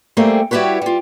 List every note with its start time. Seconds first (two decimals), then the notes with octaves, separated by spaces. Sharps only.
0.17 G3 A3 A#3 C4 G#4
0.51 G3 E4 F#4 G4 B4 C#5
0.82 G3 F4